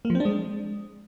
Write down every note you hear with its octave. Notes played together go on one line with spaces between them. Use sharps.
A#3
F3
C4
D4
G#3